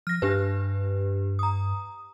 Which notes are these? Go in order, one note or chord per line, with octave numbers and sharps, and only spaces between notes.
F3 F6 A#6
G2 D4 G4 B4
A#5 D#6